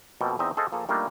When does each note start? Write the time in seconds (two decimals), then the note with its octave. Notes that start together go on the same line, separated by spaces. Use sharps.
0.21 F2 B2 A#3 A4 G5
0.39 E2 C4 D#4 D#5 E5
0.57 G#4 A4 C5 D#5 F5
0.72 F3 A#3 G#4 A4
0.89 G3 A3 A#3 D4 D#4 F4